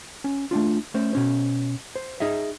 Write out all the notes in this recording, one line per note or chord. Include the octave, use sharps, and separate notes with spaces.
C#4
A3 C#4 D4 F4
A3 C#4 C5
B2 C#4 C5
C5
D#4 G#4 D#5 E5